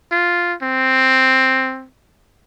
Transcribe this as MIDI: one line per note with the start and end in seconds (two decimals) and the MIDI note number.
0.12 0.54 65
0.63 1.87 60